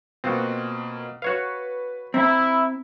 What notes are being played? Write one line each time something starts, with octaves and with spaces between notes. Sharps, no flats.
B2 A#3 C4 F4 F#4
F#4 B4 C#5 F5
C4 E4 A#5